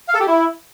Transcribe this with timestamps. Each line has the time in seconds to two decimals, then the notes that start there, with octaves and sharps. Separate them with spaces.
0.08 F5
0.14 A4
0.21 G4
0.27 E4